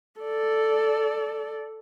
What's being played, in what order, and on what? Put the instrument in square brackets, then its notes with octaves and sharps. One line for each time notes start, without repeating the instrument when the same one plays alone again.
[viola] A4 D5